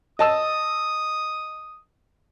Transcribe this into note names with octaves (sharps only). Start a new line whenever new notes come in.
D#5 A5 D#6 E6